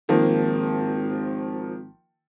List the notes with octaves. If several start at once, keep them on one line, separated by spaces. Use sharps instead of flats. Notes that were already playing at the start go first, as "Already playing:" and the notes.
G#1 D#3 F3 A#3